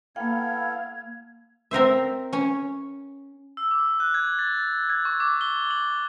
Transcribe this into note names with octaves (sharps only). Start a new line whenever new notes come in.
A#3 B3 E4 A4 F5 G5 G#6
C4 A#4 C5 E5
C#4 C#5
E6
D6
F#6
G#6
A6
G#6
C#6
D6
G7
F#7